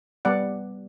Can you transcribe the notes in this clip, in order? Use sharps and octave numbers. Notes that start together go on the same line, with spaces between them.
G3 B3 D5 F#5